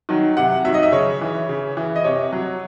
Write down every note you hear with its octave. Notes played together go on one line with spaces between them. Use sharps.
D#3 F#3
C3 F#5
D#3 F#3 E5
D#5
E5
C#3 C#5
E3
C#3
E3
D#5
C3 C#5
F#3